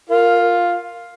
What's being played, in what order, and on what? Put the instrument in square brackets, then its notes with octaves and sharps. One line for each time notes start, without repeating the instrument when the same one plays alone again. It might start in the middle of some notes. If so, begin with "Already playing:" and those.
[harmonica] F4 F5 [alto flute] A#4